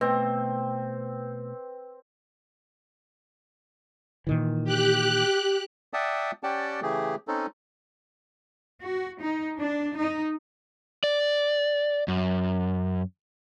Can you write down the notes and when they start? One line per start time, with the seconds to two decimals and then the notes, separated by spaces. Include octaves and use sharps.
0.01 B2 A3 C4 B4 G5
4.27 A#2 D#3 E3
4.64 G4 F#6
5.93 D5 E5 F#5 G5 A5 D#6
6.43 C#4 G4 D5 F#5 G5 A5
6.82 C#3 E3 A3 G4 G#4
7.28 C4 C#4 D#4 A4
8.83 F#4
9.21 D#4
9.59 D4
9.95 D#4
11.04 D5
12.08 F#2